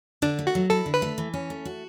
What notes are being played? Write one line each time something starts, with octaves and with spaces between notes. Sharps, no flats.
D3 D4
A3
F#4
F#3
E4 A4
D3
B4
A3
E3
C#4
A3
F#4